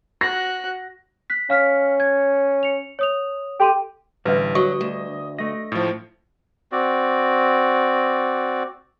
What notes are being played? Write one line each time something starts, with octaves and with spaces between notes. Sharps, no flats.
F#4 F#6 A#6
F#6 B6
C#4 F5 F6 B6
G#6
C#7 F7
C#5 D#6 F7
G4 A4 C6 D#7
A1 D3 G3 B4 E5
F#3 D#5 C#6
D2
A3 D#5 A#6
A2 F3
C4 F#4 D5